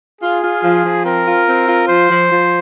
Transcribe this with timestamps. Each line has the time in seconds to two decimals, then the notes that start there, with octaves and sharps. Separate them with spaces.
0.21 F4 G#4
0.42 F4
0.63 F3
0.84 F3
1.05 C4 A#4
1.26 F4
1.47 C4
1.68 F4
1.88 F3 C5
2.10 F3
2.30 F3